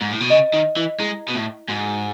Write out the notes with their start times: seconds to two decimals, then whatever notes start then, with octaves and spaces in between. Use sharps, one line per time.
0.01 G#2
0.10 A2
0.20 B2
0.30 C#3 D#5
0.53 D#3
0.76 E3
0.99 G#3 E4
1.28 B2
1.35 A2
1.69 G#2 F#4